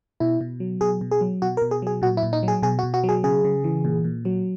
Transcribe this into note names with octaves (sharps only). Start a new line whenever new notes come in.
B2 E4
B2
F#3
B2 G#4
B2
G#4
F#3
B2 F#4
A#4
B2
G#4
F#3 G#4
A#2 F#4
E4
A#2
D#4
F#3
G#4
B2 G#4
F#4
B2
F#4
F#3
G#4
C#3 G#4
C#3
E3
A#2
A#2
F#3